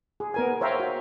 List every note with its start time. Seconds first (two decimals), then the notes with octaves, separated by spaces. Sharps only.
0.20 G#4
0.34 B3 A#4 G#5
0.61 C5 C#5 E5 F5 G5 A#5
0.80 F#4